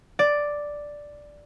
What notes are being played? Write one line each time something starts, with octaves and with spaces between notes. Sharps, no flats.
D5